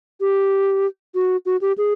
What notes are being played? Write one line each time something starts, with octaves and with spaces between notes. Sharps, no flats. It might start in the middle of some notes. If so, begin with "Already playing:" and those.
G4
F#4
F#4
G4
G#4